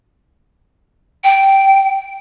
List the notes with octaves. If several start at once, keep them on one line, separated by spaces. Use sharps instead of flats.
G5